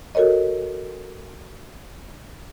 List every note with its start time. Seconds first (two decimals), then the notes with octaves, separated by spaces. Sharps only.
0.15 F#4 A4 A#4 C#5 D#5